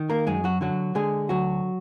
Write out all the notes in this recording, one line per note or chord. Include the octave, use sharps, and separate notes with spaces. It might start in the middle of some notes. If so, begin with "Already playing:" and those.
Already playing: D#3
A#3 A#4
F#2 G#3 G#4
F#3 F#4
D3 F#3 F#4
D3 G#3 G#4
D2 F#3 F#4